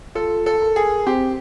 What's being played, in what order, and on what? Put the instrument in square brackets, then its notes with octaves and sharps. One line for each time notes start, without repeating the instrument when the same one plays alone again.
[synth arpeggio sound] F4 [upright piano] A4
[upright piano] A4
[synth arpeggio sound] A#4
[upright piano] G#4
[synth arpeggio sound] C4 [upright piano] G4